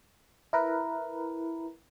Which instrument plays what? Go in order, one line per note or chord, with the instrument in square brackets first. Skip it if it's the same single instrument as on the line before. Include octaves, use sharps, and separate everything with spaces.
[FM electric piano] E4 A#4 B4